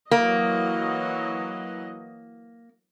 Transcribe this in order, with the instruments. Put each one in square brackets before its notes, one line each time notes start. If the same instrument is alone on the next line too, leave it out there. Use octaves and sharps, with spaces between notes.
[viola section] E3 F#3 D#5 [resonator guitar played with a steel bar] A#3